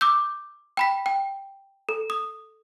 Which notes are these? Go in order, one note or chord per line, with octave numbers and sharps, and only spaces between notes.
D6 E6 G6
G5 B5 B6
G5
A4
D#6